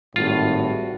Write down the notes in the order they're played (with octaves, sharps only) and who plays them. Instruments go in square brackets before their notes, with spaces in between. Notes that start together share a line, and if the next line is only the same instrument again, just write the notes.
[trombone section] G#1 A2 [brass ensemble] G3 F#4 [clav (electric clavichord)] F4